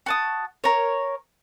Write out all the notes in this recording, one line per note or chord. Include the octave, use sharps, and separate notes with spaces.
F#4 A5 D#6
A#4 C#5